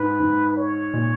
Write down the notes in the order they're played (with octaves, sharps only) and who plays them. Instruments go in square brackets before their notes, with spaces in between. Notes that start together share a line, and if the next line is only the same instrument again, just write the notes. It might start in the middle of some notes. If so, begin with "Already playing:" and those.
Already playing: [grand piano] G#2 [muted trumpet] B4
[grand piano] G#2
[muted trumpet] C#5
[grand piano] A#2